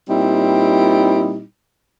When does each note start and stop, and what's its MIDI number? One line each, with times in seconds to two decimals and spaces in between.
0.08 1.42 46
0.08 1.42 55
0.08 1.42 60
0.08 1.42 63
0.08 1.42 64